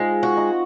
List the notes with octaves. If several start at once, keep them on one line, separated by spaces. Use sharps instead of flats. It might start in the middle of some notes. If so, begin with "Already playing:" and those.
Already playing: G#3 C4 D#4 F4
F#4
D#4